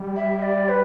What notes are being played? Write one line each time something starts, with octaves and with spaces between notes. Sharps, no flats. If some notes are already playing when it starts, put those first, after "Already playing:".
Already playing: G3
E5
D5
B4